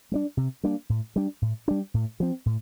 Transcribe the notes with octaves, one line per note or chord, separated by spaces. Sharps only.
G3 A#3 D4
C3
G3 A#3 D4
A2
G3 D4
A2
G3 D4
A2
F3 C4
A2